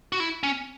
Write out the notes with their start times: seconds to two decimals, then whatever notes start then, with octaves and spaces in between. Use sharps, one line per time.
0.12 F#4
0.20 E4
0.43 C#4